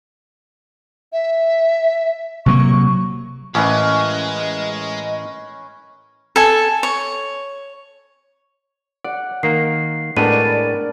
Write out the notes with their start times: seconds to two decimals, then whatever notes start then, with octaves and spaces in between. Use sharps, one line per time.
1.13 E5
2.46 C3 F#3 A#3 C#6
3.55 A1 G#3 C#4 A#4 B4 D#5
6.36 A4 G#5
6.83 C#5
9.04 D5 F#5
9.43 D#3 A#3 C7
10.17 A2 G#3 B3 D4 A#4 D5 D#7